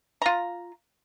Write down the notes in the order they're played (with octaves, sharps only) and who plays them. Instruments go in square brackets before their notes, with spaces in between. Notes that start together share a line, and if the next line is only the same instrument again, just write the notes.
[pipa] F4 A#5